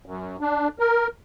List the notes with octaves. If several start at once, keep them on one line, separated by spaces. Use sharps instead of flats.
F#2
D4
A#4